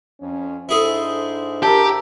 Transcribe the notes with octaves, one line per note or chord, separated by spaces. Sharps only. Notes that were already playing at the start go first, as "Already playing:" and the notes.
F2 C#4
G#2 D4 E4 G#4 A4 C5
G4 A#4 E5 A5